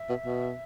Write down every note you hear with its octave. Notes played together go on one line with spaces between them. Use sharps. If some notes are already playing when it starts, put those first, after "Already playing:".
Already playing: E5
B2
B2